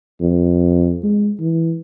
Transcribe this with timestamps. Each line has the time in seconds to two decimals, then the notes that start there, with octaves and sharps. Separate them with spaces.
0.21 F2
1.03 G#3
1.40 E3